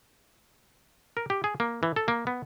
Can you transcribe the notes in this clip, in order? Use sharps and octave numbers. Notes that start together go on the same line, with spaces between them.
A#4
G4
G#4
A#3
E3
A4
A#3
B3